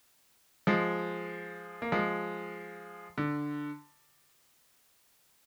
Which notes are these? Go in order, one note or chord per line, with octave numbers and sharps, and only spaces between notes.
F3 G#3
A#3
F3 G#3
D3